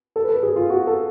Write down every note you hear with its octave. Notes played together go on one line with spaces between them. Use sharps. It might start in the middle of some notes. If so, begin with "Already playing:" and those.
A4
B4
A4
G#4
F4
F#4
A4